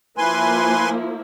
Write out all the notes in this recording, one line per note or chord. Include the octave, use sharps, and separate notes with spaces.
F3 A#3 E4 B4 G#5 C6